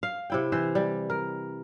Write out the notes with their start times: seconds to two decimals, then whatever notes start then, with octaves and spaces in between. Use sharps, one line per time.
0.03 F5
0.30 C3 E4 G5
0.52 E3 C5 E5
0.75 G3
1.10 A#4